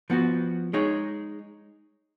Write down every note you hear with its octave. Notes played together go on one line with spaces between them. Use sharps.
F3 B3 F#4
G#3 D#4 G#4 C#5